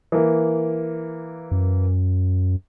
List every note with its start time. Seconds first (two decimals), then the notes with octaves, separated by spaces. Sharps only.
0.12 E3 A#3
1.51 F#2